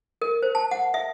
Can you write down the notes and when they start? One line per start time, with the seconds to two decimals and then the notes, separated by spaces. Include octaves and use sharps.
0.22 A#4
0.42 C5
0.55 A5
0.71 F#5
0.94 E5